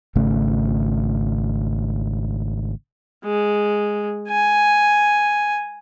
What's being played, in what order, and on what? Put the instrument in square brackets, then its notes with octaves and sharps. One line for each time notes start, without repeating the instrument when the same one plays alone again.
[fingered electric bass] G#1 C#3 A3
[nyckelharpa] G#3
G#5